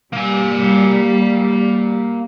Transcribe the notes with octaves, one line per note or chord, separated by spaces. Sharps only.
G3 A#3 G#5